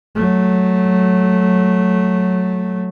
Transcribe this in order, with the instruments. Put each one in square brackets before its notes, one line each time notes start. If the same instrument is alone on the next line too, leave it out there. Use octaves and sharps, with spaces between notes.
[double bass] F#3 A3